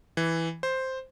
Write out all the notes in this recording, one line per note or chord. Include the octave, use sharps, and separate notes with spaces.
E3
C5